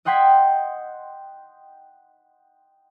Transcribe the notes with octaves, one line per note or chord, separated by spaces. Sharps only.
D#5 F#5 G5 C6 G#6 B6